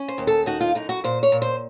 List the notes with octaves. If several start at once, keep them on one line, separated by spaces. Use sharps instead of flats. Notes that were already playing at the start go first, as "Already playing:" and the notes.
Already playing: C#4
C5
D#2
A4
D#4 F#4
F4
F#2 D#4
F#4
A#2 C5
C#5
A#2
C5